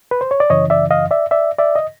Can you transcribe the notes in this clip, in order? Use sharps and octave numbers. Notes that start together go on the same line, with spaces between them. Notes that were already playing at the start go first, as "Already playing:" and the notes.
B4
C5
C#5
D5
F#2 C#3 E3 C#5 D#5
D5 E5
D#5 F5
D5 E5
D5 E5
D5 E5
D#5